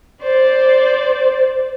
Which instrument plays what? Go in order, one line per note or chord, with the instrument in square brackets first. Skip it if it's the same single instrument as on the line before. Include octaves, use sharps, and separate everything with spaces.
[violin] C5 D5